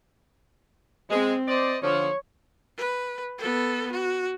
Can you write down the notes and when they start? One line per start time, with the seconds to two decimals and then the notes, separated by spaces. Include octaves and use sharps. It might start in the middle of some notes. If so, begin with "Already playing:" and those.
1.10 G#3 C4
1.48 C5 D5 D#5
1.83 D3 F3 C#5
2.77 B4
3.38 B3 A4
3.92 F#4